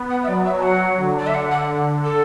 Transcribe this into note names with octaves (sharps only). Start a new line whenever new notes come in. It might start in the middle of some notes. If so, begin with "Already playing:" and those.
Already playing: B3
F#5
E5
F#3 D5
E5
A5
F#5
D3
D5
E5
F#5
F#5
A4